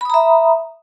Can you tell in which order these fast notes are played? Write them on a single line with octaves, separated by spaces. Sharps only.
B5 D#6 A#5 E5